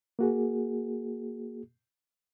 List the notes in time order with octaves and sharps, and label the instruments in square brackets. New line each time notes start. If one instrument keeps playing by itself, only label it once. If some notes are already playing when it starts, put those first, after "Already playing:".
[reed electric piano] A#3 F#4 G#4